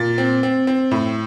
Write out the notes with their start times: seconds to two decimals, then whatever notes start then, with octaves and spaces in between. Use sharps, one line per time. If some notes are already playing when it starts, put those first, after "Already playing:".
Already playing: A#2 A6
0.18 C4
0.43 C4
0.67 C4
0.91 A2